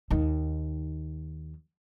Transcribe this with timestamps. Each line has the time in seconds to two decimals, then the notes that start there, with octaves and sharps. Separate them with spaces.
0.10 D#2 D#3